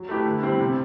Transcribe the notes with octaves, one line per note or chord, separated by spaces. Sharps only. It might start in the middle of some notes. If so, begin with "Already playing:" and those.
Already playing: F#3
A3 E4 G4 B4
D3
G3 C4 E4
C3